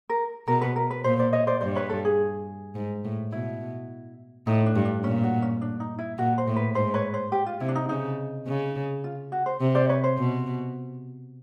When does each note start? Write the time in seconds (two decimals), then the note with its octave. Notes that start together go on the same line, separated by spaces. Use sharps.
0.09 A#4
0.47 B2 A#4
0.61 B4
0.76 A#4
0.91 B4
1.04 A#2 C5
1.19 C5 D5
1.33 C#5 D#5
1.47 C5 D5
1.61 G2 C5 D5
1.75 B4 C#5
1.90 A4
2.05 G#4
2.75 G#2
3.04 A2
3.32 B2 E4
4.47 A2 D#4
4.66 D4
4.75 G2
4.85 D4
5.04 A#2 C#4
5.24 F#4
5.42 C#4
5.61 D4
5.80 D#4
5.99 E4
6.18 A#2 F#4
6.38 C5
6.47 A2
6.56 B4
6.75 G#2 C5
6.94 B4 C#5
7.14 C5
7.32 G4
7.46 F4
7.60 C3 E4
7.68 D4
7.76 D#4
7.89 C#3 D#4
8.47 C#3
9.04 F4
9.32 F#4
9.46 C5
9.60 C3
9.75 C5 D5
9.89 B4 C#5
10.04 C5
10.18 B2